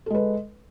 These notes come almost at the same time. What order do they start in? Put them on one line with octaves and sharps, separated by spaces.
A4 G#3 B4